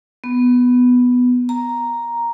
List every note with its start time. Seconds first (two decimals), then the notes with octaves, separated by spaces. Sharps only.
0.24 B3
1.49 A#5